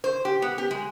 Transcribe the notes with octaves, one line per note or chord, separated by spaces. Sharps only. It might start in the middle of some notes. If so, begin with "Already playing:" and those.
C5
G4
B3
G4
G#3